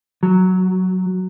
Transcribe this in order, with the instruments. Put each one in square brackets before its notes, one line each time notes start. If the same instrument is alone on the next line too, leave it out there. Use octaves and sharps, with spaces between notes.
[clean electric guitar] F#3